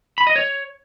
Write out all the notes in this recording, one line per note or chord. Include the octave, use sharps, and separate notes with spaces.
B5
D#5
C#5